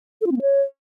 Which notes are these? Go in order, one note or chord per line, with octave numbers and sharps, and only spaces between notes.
A4
F4
C4
A#3
C#5